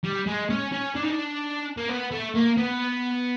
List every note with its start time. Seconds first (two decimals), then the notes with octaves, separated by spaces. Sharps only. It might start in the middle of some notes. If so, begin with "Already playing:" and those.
0.04 G3
0.27 G#3
0.50 C#4
0.73 C#4
0.96 D4
1.04 D#4
1.11 D4
1.77 A#3
1.89 B3
2.11 A3
2.35 A#3
2.57 B3